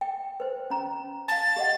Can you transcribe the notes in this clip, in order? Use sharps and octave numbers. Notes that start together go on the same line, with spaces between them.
G5
B4 C5
C#4 A#5
F5 A5 A6
G4 D#5 F#5